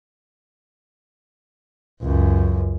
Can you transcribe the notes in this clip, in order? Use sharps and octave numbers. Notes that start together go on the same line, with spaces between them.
C#2 F#2